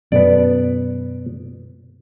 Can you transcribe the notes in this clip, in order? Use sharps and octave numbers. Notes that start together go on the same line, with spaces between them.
F#2 B2 B3 A4 D5